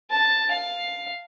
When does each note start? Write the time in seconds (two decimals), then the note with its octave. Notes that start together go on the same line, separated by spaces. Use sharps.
0.10 A5
0.51 F5